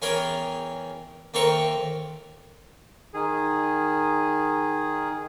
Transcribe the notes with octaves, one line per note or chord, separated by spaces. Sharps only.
E2 C#4 G#4 A#4 G5 B5
D#2 C4 A4 A#4 E5 C#6
D#3 G#4